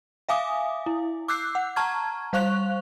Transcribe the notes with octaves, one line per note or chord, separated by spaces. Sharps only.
E5 F5 G#5 D6 D#6
E4
D6 E6 F#6 G6 C7
F#5
A5 A#5 C#6 F6 G#6
G3 C5 F5 C#6 F#6 F7